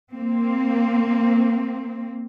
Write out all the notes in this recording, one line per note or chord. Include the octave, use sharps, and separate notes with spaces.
A#3 C4